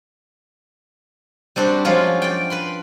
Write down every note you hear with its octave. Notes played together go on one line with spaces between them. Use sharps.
G3 C4 D4 F#4
F3 F#3 G#3 C#4 D4 F4
D5 G5
B4 B5 C6